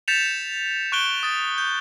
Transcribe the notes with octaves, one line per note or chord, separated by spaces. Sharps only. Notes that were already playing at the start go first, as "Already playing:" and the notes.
G6 A6 B6 C#7 E7 F7
C#6 F#6 D7 G7
D#6 A6
G6